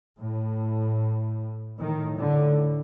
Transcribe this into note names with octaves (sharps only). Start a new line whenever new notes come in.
A2
A2 D#3
D3